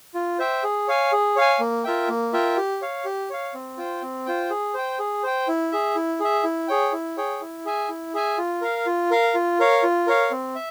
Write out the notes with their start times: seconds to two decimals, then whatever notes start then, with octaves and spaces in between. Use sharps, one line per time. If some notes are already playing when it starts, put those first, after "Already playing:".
0.14 F4
0.39 C5 E5 G5
0.63 G#4
0.88 C#5 F5 G#5
1.12 G#4
1.36 C#5 F5 G#5
1.59 A#3
1.84 F4 A#4 E5 G5
2.09 A#3
2.33 F4 A#4 E5 G5
2.57 G4
2.82 C#5 F5
3.05 G4
3.30 C#5 F5
3.54 C4
3.77 F4 C5 G5
4.02 C4
4.26 F4 C5 G5
4.50 G#4
4.74 C5 G5
4.99 G#4
5.23 C5 G5
5.48 E4
5.72 G#4 E5
5.95 E4
6.20 G#4 E5
6.44 E4
6.68 G#4 C#5 G5
6.92 E4
7.17 G#4 C#5 G5
7.41 E4
7.65 G#4 E5 G#5
7.89 E4
8.14 G#4 E5 G#5
8.38 F4
8.61 A#4 F5
8.86 F4
9.11 A#4 F5
9.34 F4
9.60 A#4 C#5 F5
9.83 F4
10.07 A#4 C#5 F5
10.31 C4
10.55 E5